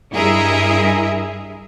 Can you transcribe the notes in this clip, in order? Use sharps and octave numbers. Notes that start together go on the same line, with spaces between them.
G2 E4 G#4 A#4 D#5 E5